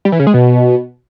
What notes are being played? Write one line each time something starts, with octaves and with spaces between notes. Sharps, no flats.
G3
E3
C#3
G#3
B2